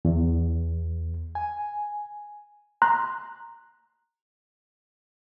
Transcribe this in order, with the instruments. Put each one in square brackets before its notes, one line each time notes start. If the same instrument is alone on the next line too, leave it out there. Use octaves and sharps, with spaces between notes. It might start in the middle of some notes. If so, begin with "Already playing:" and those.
[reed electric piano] E2
G#5
[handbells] A#5 C6 F#6